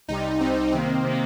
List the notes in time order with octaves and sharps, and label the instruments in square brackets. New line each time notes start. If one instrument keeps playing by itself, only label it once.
[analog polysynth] C2 C3 G3 [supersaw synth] D#4
[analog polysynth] C2 C3 G3 [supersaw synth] C4
[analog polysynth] C3 D#3 A#3 [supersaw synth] C4
[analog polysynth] C3 D#3 A#3